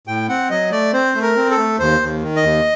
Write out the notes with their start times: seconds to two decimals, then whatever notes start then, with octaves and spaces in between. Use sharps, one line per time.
0.07 A2 G5
0.29 C4 F#5
0.50 F#3 D#5
0.72 A3 D5
0.93 C4 C5
1.15 A3
1.22 A#4
1.36 C4
1.51 A4
1.57 A3
1.79 D#2 C5
2.00 D#2
2.22 D#3
2.36 D#5
2.43 D#2